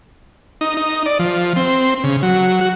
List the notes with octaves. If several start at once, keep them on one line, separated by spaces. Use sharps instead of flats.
D#4
D#4
D5
F3
C4
C#3
F#3
F#4